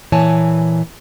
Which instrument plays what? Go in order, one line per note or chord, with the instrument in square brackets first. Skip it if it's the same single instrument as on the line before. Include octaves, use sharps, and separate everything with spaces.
[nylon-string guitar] A#2 E3 C#5 G#5 A5